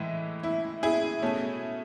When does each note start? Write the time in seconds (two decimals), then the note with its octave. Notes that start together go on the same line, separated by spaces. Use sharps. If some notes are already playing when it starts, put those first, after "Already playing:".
Already playing: A2 E3 G#3 E4
0.43 E4
0.83 E4 G#4
1.22 B2 A3 C#4